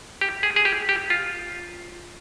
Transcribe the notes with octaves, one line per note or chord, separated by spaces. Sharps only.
G4
G#4
G#4
G4
G4
F4